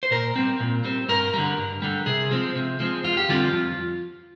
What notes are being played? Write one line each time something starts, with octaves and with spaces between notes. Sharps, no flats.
C5
A#2 A#4
G3 C4
A#2
G3 C4
G2 A#4
D3 G3
G2
D3 G3
C3 G#4
F3 G#3 C4
C3
F3 G#3 C4
F2 F4
G4
D3 G3 C4 F4
F2